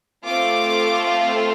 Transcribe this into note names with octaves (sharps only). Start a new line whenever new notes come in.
A3 C4 F4 A4 D6